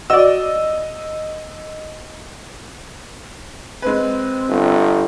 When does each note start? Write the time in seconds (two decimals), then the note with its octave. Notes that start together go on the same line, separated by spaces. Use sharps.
0.10 F#4 D5 D#5 E6
3.82 G#3 C4 B4
4.48 G1